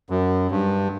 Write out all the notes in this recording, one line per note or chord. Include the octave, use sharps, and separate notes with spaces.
F#2
G2